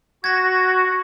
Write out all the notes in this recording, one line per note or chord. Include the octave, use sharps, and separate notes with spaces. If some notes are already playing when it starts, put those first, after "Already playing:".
F#4 G#6 A#6